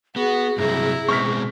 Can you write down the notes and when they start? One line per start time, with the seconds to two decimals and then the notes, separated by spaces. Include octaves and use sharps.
0.16 B3 F#4 G#4
0.58 G2 C3 F#3 E4 A#5
1.08 B2 G#3 C4 C#6 F6 B6